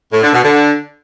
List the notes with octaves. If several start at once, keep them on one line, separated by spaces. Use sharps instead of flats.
A2
D3
B2
D3